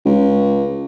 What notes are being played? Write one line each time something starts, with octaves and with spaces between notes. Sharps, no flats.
C#2